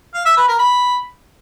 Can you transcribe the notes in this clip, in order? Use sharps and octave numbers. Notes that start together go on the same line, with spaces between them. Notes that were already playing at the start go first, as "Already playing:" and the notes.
F5
E5
B4
A#4
B5